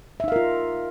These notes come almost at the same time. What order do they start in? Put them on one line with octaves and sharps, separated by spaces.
E5 D#4 F5 A#4 F4